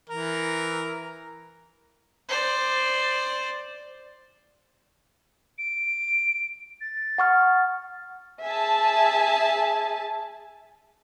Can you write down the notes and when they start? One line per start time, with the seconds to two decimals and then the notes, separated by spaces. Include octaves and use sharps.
0.10 E3 A#4
2.29 C5 D5
5.58 D7
6.81 A6
7.18 F#5 C#6 F6
8.42 G#4 E5 G#5 A5